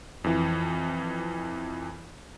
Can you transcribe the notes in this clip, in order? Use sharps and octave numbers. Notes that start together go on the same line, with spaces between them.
F2 E3